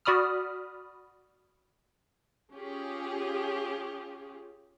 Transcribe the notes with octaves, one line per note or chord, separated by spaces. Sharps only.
F#4 D5 B5 D#6 F6
C#4 F4 G4 G#4